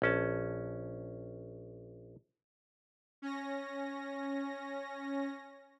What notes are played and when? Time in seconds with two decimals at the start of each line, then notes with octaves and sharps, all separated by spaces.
0.02 A#1 C#4 A5
3.22 C#4 A#6